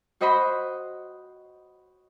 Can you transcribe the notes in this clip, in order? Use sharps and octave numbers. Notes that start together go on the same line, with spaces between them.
F#4 C5 D#5 F#5 B5 C6